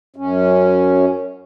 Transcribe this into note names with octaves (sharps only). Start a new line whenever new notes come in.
F#2 C#4